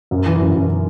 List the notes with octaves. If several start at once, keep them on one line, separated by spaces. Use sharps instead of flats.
F#2
E3
F#2
F#2